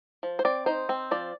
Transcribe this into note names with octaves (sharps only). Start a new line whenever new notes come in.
F3
C5
C4 D5
D#4 C5
C4
F3 D5